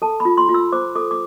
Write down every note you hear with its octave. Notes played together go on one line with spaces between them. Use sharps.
A4 A5
B5
F4
C6
F4
E6
C5 D6
A4 D6
D6